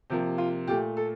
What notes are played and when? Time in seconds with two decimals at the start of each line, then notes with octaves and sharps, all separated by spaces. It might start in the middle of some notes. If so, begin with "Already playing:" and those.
0.10 C3 F3 A#3 G4
0.38 F4
0.67 A#2 A3 G4
0.97 A4